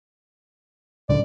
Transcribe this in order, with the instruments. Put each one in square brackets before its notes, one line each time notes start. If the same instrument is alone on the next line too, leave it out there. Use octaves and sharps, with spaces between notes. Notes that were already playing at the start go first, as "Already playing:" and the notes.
[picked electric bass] D1 C#2 D3 [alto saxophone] D5